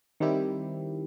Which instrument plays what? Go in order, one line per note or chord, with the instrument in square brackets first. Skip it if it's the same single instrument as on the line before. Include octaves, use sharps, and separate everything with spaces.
[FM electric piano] D#3 G3 C4 E4 G4